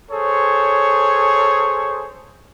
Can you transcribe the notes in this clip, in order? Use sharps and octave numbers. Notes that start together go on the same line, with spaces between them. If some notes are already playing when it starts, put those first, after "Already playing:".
G#4 A4 C5 C#5